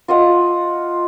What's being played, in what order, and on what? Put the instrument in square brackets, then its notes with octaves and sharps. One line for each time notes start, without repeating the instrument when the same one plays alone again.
[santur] F4 D#5 F#5